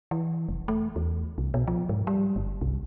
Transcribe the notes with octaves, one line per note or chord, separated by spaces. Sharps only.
E3
F1
A3
E2
C2
B2
F3
G#2
G3
G1
C2